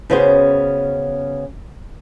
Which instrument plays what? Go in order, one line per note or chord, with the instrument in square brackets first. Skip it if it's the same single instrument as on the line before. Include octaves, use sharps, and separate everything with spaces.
[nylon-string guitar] C#3 B3 C#4 F#4 G#4 C5